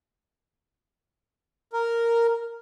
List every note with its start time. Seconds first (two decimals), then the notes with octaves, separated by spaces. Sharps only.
1.73 A#4